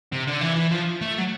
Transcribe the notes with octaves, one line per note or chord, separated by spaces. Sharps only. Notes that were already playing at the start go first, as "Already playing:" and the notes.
C3
D3
E3
E3
F3
A3
F#3